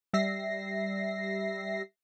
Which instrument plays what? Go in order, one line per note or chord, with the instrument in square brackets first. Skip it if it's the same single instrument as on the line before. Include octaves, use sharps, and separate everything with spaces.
[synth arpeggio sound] G3 E5 A#6 C7